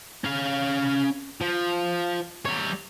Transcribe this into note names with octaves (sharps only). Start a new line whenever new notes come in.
C#4 F5
F3
G3 C#5